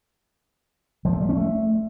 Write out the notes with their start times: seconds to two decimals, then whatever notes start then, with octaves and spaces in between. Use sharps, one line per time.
1.05 F3
1.13 A3
1.21 G3
1.29 C#4
1.37 A3